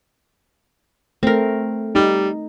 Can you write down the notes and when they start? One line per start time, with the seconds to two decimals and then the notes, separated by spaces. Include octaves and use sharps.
1.23 A3 C4 A#4
1.95 G3 D#4